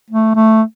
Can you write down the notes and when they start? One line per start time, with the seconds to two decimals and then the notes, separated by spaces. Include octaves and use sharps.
0.10 A3
0.35 A3